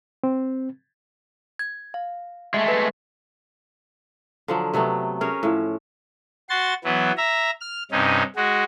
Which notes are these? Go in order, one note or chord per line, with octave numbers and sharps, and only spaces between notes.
C4
G#6
F5
G#3 A3 E5
B4
D3 F3 F#3
C3 F#3 A3 B3
C#4 F#4 G#4 A#4
A2 F3
F#4 C6 A6
E3 F#3 B3
E5 A#5
F6
G2 C3 C#4 D#4
G#3 F#4